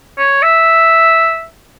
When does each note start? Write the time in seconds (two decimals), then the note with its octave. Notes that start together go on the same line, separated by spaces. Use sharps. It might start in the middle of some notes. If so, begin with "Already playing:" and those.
0.18 C#5
0.43 E5